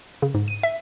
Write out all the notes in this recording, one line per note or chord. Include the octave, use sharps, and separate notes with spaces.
C#3
G#2
D#7
E5